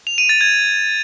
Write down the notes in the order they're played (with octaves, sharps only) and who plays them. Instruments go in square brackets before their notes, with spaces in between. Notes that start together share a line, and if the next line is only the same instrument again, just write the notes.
[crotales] F7
D#7
A6
G#6